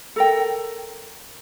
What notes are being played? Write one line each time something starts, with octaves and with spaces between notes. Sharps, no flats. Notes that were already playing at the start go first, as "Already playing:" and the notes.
A4 A#4 G5